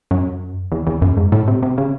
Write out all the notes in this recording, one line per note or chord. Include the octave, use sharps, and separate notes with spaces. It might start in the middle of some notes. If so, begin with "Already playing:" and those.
F#2
E2
E2
F#2
G#2
A2
C3
C3
C#3